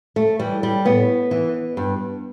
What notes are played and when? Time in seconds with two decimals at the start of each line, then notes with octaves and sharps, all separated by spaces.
0.16 A3
0.39 E3 G3
0.63 G3
0.85 A2 B3
1.31 E3
1.77 G2